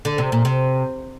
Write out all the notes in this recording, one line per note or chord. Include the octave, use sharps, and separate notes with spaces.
D3
C3
A#2
C3